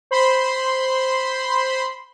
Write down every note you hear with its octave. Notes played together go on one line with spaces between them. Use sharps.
C5 B5 C6